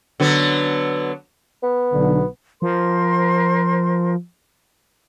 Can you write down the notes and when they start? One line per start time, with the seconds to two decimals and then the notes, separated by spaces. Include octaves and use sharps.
0.20 D3 F#3 B3
1.63 B3
1.93 B1 D3
2.62 F3 A#4 C5 C6